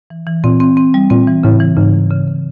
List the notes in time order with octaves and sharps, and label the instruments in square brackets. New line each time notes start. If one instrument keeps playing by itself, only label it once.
[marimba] E3
E3
[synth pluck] A#2 [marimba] C4
[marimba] C4
C4
G3
[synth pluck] A#2 [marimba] C4
[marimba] E3
[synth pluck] A2 [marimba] C#3
[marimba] E3
[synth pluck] G#2 [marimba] C#3
[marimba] C#3
C#3
C#3